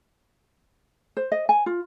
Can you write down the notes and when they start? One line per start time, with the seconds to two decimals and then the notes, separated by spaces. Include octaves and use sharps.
1.17 C5
1.32 D#5
1.49 G#5
1.66 F4